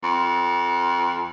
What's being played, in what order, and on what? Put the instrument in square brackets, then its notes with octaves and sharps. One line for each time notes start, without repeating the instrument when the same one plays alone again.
[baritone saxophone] F2